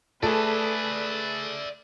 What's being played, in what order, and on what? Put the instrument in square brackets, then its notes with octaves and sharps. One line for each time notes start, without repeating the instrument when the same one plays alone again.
[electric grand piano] A3 G#4 [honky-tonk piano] A4 [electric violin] B4 [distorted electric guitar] D5 E5